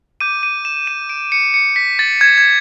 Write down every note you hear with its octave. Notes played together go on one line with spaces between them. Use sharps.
D6 G6 D#7
D#7
E7
D#7
D7
C#7
C#7
B6
A6
G#6
G#6